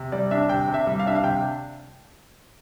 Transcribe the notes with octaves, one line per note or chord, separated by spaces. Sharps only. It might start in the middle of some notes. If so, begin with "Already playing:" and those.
Already playing: C3
G3 D5
D4 E5
C3 G5
C3
E5
G3
F5
D4 E5
F5
C3 G5